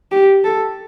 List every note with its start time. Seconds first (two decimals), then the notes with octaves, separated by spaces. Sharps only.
0.12 G4
0.44 A4